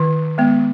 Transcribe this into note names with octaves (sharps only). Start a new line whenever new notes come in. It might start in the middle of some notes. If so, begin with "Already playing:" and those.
Already playing: D#3
G#3 B3